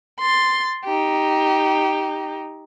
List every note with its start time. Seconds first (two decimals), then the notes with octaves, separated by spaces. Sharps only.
0.19 C6 A6
0.85 D#4 G4